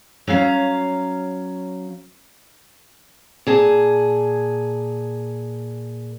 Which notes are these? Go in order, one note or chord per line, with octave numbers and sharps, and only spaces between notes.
F#3 C#4 F5 A#5
A#2 G#4 A5